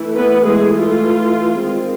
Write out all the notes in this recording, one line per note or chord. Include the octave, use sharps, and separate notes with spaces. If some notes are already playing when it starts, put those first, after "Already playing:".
Already playing: E3 A3 E4
B3 B4
G#3 G#4
F4
D#3 G#3 C4